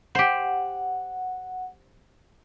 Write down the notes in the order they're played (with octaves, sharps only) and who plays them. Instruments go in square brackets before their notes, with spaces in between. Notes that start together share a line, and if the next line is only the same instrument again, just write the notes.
[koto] G4 C5 [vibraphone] F#5